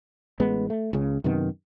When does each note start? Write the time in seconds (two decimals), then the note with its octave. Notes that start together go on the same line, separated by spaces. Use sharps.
0.40 A1 G#3 B3
0.70 A3
0.93 C#2 C#3
1.24 F#2 C3 D#3 B3